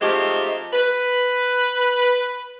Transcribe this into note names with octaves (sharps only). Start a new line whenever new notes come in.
F3 G#3 A3 C4 D#4 G4
B4